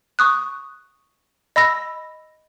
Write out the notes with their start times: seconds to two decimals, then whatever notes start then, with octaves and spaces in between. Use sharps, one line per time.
0.19 C#6 D#6 F#6
1.56 D#5 B5 E6 A#6